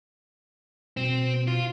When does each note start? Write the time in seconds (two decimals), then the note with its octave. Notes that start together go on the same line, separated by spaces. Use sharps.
0.97 B2 C4
1.47 F4